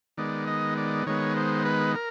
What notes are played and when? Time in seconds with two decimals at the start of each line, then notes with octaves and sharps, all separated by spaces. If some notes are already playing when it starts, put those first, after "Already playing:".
0.17 D#3 G#3 B3 D5
0.47 D#5
0.77 D5
1.06 D#3 G#3 B3 C#5
1.37 C5
1.65 B4
1.95 A#4